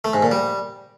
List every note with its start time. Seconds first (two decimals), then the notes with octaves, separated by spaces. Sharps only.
0.05 A3
0.14 G#2
0.22 A#2
0.31 G3